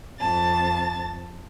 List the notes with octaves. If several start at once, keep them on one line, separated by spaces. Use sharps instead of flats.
F2 A5 A6